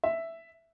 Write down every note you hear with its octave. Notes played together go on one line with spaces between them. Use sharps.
E5